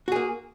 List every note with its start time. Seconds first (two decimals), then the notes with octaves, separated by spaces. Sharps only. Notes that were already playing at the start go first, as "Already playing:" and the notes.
0.08 F#4
0.12 G#4
0.16 A#3